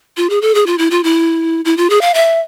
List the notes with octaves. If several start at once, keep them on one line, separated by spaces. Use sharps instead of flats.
F4
G#4
A4
G#4
F4
E4
F4
E4
E4
F4
G#4
F5
E5